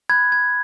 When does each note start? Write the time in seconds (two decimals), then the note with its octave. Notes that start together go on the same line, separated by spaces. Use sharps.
0.09 B5 F#6 G#6
0.32 G#6